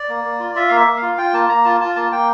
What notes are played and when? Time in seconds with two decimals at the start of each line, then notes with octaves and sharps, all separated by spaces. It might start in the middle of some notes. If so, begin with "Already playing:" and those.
Already playing: D5
0.09 A#3
0.25 A#3
0.40 F4
0.55 F4 E5
0.68 A#3 F5
0.76 E5
0.87 A#3
0.97 F5
1.02 F4
1.18 F4 G5
1.33 A#3 A5
1.49 A#3 A#5
1.65 F4 A5
1.80 F4 A5
1.96 A#3 A5
2.11 A#3 G5